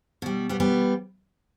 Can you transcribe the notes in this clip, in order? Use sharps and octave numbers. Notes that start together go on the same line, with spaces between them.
B2 G3
G3 B3
G3 B3